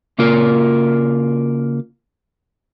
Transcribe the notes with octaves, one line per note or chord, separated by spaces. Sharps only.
C#3 A#3 F4 A#4